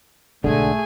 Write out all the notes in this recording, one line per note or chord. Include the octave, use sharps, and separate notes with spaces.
B1 G#2 D3 A3 G#4 G#5